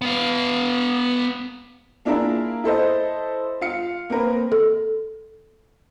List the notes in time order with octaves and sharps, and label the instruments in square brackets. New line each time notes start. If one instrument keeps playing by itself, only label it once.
[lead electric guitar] B3 F5
[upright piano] A#3 D4 E4 F4 G#4 A#4
E4 A4 C5 D#5
F4 F5 C#7
A#3 C4 A#4 B4
[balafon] A4